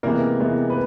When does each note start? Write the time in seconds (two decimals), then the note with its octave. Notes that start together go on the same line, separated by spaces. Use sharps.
0.03 C3 E3 G#3 A#3 B3 A#4
0.40 C3 E3 G#3 B3
0.70 B4